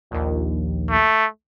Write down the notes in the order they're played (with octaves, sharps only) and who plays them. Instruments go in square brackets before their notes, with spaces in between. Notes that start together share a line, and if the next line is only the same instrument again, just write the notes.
[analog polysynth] A#1 D#2
[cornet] A3